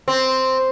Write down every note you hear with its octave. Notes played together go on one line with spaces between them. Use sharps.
C4